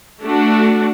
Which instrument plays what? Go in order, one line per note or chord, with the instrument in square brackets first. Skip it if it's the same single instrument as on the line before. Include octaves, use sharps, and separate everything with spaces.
[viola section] A3 D4 F#4